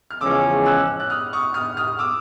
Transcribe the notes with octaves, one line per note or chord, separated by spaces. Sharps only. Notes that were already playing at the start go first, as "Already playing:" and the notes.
F6
E2 C#3 F3 G#3 C#4 D6 E6
E6 F#6
F#6
D#6 F6
C#6 D#6
D#6 F6
D#6 F6
D6 E6